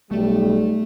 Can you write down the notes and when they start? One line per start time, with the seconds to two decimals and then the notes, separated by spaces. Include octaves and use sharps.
0.11 B1 G3 A3